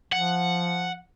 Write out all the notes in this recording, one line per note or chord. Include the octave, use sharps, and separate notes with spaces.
F3 F#5